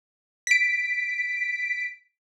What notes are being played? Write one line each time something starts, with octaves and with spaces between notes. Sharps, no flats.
B6 D7